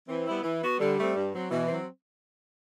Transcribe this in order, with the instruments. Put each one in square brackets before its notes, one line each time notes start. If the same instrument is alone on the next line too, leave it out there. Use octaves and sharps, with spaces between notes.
[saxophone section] E3 [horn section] C4
[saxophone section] G3 B3 E4
E3
B3 F#4
[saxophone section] D3 [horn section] G3
[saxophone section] A3 C4
G2
F#3 C4
[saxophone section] B2 [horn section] E3
[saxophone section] F#3 C4